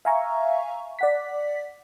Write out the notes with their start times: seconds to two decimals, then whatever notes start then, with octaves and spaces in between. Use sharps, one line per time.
0.05 E5 F5 G#5 A#5 C#6
0.99 D5 F#5 B6